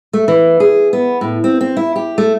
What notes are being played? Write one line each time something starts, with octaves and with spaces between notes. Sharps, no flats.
A3
E3
G#4
B3
A2
C4
C4
E4
G4
A3